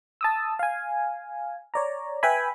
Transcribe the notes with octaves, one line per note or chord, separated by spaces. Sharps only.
A5 D#6 E6
F5 G#5
C#5 D5 A#5
B4 E5 G5 G#5 B5